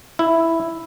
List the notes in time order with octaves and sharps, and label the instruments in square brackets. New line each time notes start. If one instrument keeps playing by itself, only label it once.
[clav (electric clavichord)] E4